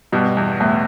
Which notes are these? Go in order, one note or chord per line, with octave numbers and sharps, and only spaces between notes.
G2 B2
E2
E2 A2